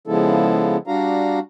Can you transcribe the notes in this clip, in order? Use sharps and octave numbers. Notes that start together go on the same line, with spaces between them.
C#3 F3 G#3 B3 E4 A4
G3 D4 F#4 F5 A#5